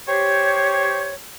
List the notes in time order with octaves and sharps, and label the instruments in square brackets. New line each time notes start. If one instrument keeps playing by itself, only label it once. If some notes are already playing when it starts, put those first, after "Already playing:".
[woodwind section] G4 C5 C#5